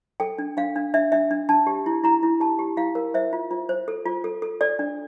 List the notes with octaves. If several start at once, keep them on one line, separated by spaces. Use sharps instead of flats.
A4 G5
D4
D4 F5
D4
D4 E5
D4 E5
D4
D4 A5
G4
E4
E4 A#5
E4
G4 A5
G4
E4 F5
A#4
C5 E5
F4
F4
C5
A4
F4
A4
A4
A4 D5
D4